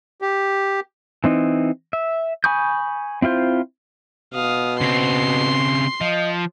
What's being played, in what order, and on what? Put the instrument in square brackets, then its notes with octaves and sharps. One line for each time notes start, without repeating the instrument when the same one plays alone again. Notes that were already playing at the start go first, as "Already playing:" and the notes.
[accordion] G4
[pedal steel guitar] E3 C4 D#4
E5
G#5 B5 C#6 D#6 G6
C4 E4 F4 C5
[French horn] B2 [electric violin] F5 D#6
[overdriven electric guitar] C#3 C4 [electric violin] C6 C7
[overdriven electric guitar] F3 [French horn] D#5